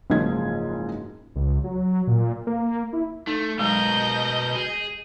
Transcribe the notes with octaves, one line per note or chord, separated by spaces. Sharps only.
F#1 G#2 F3 F4 G#4 G#6
C#2
F#3
A#2
A#3
E4
A3 D#4
B2 F#3 G#3 A#4 D#5 G6
G#4